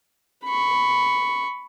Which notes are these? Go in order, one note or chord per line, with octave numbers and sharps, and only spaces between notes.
B5 C#6